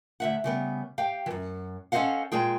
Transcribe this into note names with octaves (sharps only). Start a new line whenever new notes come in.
D2 E5 F#5
C#3 G3 B3
G4 F5 G5
F#2 E3
C#4 A4 C5 D#5 F5 F#5
A#2 G#3 G#4 G5